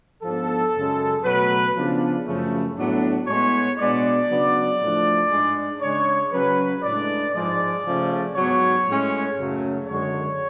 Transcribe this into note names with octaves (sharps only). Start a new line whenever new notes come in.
G#2 F3 B3 D4 A4
F#2 C#3 G#3
B2 F#3 A3 B4
C#3 F3 B3 D4
F#2 C#3 F3 A3
A2 F#3 B3 D4
A2 G#3 B3 C#5
B2 G#3 B3 D4 D5
C#3 F#3 B3 D4
A2 F3 A3 D4
G#2 G#3 D4
C#3 G#3 D4 C#5
C#3 F#3 C#4 B4
A2 G#3 D4 D5
G#2 F3 G#3 D5
C#3 F3 A3 C#4
G#2 F#3 B3 C#5
A2 G#3 C#4
F#2 C#3 F#3 A3
F#2 D3 G#3 C#5